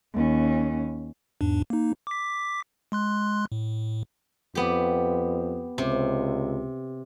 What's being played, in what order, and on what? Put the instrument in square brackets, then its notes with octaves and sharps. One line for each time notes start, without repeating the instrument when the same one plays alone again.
[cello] D#2 C#4
[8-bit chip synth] E2 G#2 D4
A#3 D#4
D6 B6
G#3 C6 F#6
A2
[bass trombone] F2 [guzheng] B3 G4
[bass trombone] C#2 [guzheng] C3